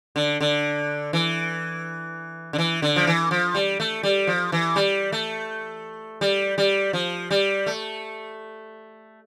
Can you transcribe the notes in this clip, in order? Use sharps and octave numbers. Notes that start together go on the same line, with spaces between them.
D3
D3
E3
D3
E3
D3
F3
E3
F3
G3
A3
G3
F3
E3
G3
A3
G3
G3
F3
G3
A3